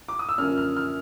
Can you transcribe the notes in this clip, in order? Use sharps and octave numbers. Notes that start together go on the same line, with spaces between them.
D6
D#6
E6
F#2 D3 F3 A#3 C#4 F6
F6
F6